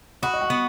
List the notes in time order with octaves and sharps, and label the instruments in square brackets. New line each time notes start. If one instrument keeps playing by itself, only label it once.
[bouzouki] F#4 [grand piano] B5 D#6
[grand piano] D#5
F#5
[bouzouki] B3